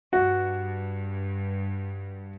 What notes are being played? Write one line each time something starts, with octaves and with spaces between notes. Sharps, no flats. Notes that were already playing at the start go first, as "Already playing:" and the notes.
G2 F#4